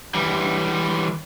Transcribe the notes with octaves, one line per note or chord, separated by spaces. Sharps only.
E3 G3